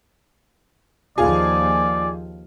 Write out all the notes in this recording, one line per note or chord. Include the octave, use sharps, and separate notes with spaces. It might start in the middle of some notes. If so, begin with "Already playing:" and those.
D#2 F3 F4 G#4 D5